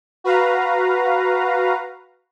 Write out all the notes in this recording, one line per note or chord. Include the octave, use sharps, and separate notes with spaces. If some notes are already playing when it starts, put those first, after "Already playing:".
F#4 B4 F5 A#5